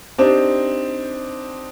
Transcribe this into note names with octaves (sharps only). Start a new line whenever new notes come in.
C4 D4 D#4 G4 C5